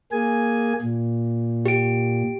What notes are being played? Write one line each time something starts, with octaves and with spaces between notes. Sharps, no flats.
A#3 G#4 G#5
A#2
G4 D7